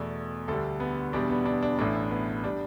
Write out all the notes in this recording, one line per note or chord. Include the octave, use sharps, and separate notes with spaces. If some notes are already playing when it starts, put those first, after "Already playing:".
Already playing: E2 B2 A3 D5
D2 D3 G3 A4
B3
E2 B2 G3 D4
B3
D4
D4
A1 A2 A3 D4
B3
G3 D4